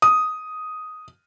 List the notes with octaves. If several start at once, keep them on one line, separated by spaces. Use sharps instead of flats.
D#6